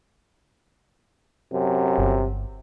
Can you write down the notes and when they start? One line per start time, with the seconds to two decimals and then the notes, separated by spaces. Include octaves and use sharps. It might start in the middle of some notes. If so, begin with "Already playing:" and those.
1.53 F#2 C3
1.98 G1